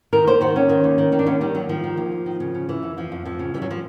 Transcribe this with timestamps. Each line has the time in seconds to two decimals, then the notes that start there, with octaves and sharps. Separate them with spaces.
0.13 D#3 A#4
0.27 D#2 C5
0.41 D#3 F#4
0.56 D#2 C#4
0.69 D#3
0.84 D#2
0.98 D#3
1.12 D#3 D#4
1.19 D4
1.26 D#2 C#4
1.41 D#3 G3
1.55 D#2 F#3
1.69 D#3 F3
1.84 D#3
1.97 D#2
2.12 D#2
2.26 D#3
2.40 C#3
2.54 C#3
2.69 E3
2.83 F2
2.97 F2 F3
3.12 F2
3.25 F2 F3
3.39 C#3
3.54 E3 G3
3.62 F#3
3.71 F3